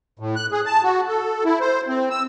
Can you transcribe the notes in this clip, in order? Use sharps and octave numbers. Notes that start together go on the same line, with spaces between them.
A2
F#6
G#4
A5
F#4
A4
E4
C5
C4
E6